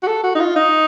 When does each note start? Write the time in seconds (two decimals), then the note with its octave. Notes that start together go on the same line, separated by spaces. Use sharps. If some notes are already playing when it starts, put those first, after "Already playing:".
0.03 F#4
0.07 A4
0.24 F#4
0.35 D#4
0.40 F4
0.56 D#4